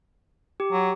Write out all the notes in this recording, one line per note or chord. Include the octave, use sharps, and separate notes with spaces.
G4
F#3